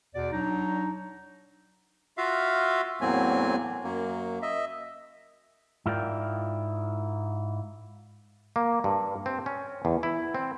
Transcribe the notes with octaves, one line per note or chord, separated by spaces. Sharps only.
E2 B2 D5
F#3 D4 D#4
F4 F#4 E5 F5
E2 A2 F#3 A#3 C4 G#5
F#2 A#3
D#5 E5
G#2 E4 F4 A#4 D5 G5
A#3
G2
C4
C#4
E2
E4
C4